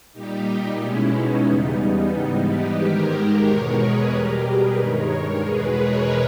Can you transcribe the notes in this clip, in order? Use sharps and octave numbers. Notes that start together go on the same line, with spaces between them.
A#2 G3 D#4 G4
B2 G#3 C#4 E4
B3 D#4
E2 C#3 G3
G#2 E3 G3
D#4 G4
G#2 D#3 G#3 G4 A#4
E2 B2 G#3 A#4 C#5
G#4 B4
B2 G3 G4 A#4
G#4 B4
G2 D#3 G#3 A#4 C#5
A#4 C#5
E2 B2 G#3 G#4 B4
A#4 C#5